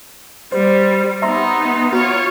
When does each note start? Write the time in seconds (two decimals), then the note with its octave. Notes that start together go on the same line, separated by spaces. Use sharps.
0.52 G3 C5
1.22 B3 D#4 E5 A#5 C6
1.93 F4 F#4 C#5